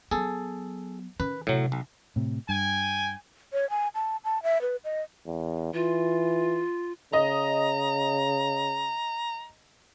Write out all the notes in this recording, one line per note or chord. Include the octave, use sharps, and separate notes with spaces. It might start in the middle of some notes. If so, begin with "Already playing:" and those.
F#3 B3 G#4 A4
D#3 C#4 B4
A2 C3 F#3
B1
A2 C3
G2 G5 G#5
C#5
G#5
A5
A5
E5
B4
D#5
E2
E3 F4
C#3 D#5 A#5